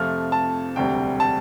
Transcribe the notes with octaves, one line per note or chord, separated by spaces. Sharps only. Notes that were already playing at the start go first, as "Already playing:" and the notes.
Already playing: F2 C3 F3 A3 F6
A5
E1 D2 C3 G3 G5
A5